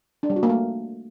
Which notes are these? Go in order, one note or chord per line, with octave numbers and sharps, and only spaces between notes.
D4
G3
F#4
A#3
A3